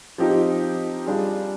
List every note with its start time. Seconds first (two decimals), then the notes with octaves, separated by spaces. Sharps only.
0.18 F3 C4 D#4 G4
1.06 G3 D4 F4 G#4